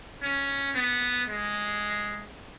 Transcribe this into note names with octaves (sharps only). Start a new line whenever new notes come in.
C#4
B3
G#3